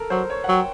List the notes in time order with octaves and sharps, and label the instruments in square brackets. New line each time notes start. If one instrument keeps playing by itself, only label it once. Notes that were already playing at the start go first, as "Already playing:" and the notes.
Already playing: [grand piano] A4 A#4
[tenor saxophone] F#3 [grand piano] C5
[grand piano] C#5
F#5
[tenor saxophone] F#3 [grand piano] G5